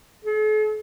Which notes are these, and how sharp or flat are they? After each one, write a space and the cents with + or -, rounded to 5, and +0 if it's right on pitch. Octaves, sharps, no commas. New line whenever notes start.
A4 -45